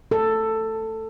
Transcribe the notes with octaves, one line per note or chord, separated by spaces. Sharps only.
A4